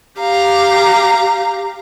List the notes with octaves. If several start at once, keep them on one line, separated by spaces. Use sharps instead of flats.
G4 F5 A#5